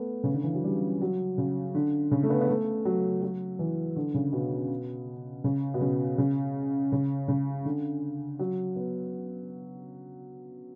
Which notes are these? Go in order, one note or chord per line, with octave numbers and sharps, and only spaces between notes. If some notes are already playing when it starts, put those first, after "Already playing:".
Already playing: A3 B3
C#3
D3
E3
F#3
G3
F#3
C#3
D3
C#3
A3
B3
B3
A3
F#3
F#3
E3
D3
C#3
B2
C#3
B2
C#3
C#3
C#3
C#3
D3
F#3
B3